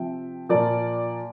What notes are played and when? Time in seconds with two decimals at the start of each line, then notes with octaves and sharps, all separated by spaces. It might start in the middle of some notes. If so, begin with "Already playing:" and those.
Already playing: C3 F3 E5 G5
0.49 A#2 F3 A#4 D5